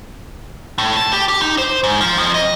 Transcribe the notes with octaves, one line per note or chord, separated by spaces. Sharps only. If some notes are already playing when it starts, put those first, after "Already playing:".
A2
A5
G4
G4
D#4
C5
G#2
F3
F2
D#5